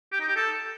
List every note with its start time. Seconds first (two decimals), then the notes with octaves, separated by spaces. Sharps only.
0.12 G4
0.20 D#4
0.28 G4
0.36 A4